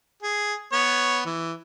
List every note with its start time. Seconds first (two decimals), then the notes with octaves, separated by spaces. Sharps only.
0.22 G#4
0.72 B3 C#5
1.25 E3